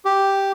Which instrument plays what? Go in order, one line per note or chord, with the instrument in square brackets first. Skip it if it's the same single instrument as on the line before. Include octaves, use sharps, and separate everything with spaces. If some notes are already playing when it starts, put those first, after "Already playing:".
[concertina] G4